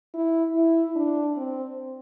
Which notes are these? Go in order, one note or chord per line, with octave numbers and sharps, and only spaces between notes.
E4
E4
D4
C4